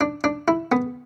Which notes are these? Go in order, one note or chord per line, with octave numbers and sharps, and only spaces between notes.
D4
D4
E4
B3